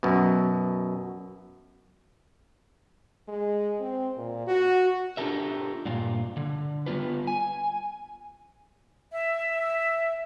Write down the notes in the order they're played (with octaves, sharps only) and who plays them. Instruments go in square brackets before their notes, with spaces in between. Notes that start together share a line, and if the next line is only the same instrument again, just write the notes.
[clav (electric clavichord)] F#2 B2
[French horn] G#3
C4
A#2
F#4
[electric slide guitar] D4 F4 G4 A4 A#4 E5
G2 A#2 F4
D3
G3 B3 F4 B4
G#5
[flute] E5